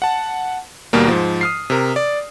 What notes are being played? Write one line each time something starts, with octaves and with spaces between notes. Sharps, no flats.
F#5 A5
D#2 B2 G3 A#3
G#2 F3
D#6 F6 C7
C3 A#4
D5